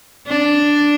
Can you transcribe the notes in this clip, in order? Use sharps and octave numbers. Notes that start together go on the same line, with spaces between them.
D4